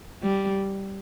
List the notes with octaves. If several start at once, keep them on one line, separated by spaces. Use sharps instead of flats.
G3